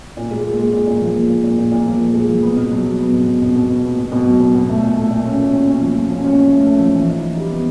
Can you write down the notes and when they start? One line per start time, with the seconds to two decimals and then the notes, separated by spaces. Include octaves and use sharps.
0.17 A#2
0.31 G#3
0.45 G#3
0.59 G#3
0.73 A#2
0.87 A#2
1.02 F3
1.16 F3
1.29 A#2
1.44 A#2
1.58 A#2
1.72 A#2
1.86 F3
2.01 A#2
2.14 G#3
2.28 F3
2.43 B3
2.56 B2
2.71 F#3
2.85 F#3
2.99 B3
3.13 B2
3.28 B3
3.42 B2
3.56 B2
3.70 B3
3.84 B3
3.99 B2
4.12 B2
4.26 F#3
4.40 B2
4.55 B2
4.69 A3
4.83 A#2
4.97 A3
5.11 A#2
5.26 C#4
5.39 A#2
5.53 C#4
5.68 C#4
5.81 F3
5.96 F3
6.10 C#4
6.24 C#4
6.38 C#4
6.52 A3
6.66 A3
6.80 F3
6.95 E3
7.09 D#4
7.22 D#4
7.37 G3
7.51 B3